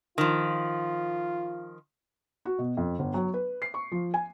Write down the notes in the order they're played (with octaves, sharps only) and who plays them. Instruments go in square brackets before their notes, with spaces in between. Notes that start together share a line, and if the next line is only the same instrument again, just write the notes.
[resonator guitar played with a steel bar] D#3 F3 [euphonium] F4
[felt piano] F#4
B2
F2
G1
F#3
B4
C7
C#6
F3
G#5